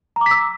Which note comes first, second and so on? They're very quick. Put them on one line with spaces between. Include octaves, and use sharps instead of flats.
A#5 D6 B6 E6